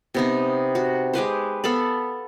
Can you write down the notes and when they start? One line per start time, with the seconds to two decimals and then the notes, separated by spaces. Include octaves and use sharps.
0.14 C3 B3 D#4
0.75 F#4
1.13 G#3 G4 B4 C5
1.64 B3 A4 F5 B5